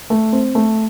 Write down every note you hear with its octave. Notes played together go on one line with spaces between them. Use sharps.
A3
C4
A3